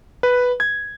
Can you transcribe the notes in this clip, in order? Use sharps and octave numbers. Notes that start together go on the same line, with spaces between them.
B4
G#6